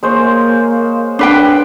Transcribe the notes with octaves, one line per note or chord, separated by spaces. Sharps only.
G#3 A#3 C5 C#5
D4 B4 G5